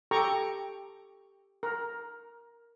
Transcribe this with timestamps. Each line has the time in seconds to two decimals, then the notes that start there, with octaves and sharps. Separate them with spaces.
0.11 G4 A4 G5 A#5 C#6
1.63 A#4